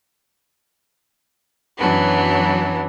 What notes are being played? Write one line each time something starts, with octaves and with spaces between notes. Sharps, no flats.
F#2 E3 F#3 B3 D4